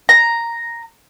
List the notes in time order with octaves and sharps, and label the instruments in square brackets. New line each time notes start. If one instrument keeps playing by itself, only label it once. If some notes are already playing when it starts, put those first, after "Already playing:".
[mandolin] A#5